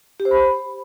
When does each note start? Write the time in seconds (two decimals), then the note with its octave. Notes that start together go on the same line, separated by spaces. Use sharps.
0.20 G4
0.25 C5
0.31 B5